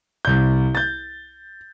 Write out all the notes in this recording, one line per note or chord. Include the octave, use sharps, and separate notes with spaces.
C2 G6
G6 A6